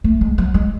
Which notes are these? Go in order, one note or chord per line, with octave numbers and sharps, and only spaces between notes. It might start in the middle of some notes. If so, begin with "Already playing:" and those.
A3
G#3
F#3
G#3